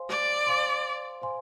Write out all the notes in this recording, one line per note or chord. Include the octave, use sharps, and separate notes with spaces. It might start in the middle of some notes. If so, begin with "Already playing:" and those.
Already playing: C5 F5 G#5 C6
D5
C5 F5 G#5 C6
C5 F5 G#5 C6